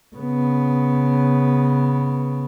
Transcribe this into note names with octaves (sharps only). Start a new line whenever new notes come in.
C#3 B3